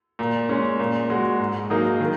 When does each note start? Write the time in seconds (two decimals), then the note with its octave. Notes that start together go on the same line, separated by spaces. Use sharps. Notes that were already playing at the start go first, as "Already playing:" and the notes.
0.19 A#2
0.49 G#3 C#4
0.79 A#2
1.10 G#3 F#4
1.40 G#2
1.70 F#3 A#3 D#4 G#4
2.00 D#3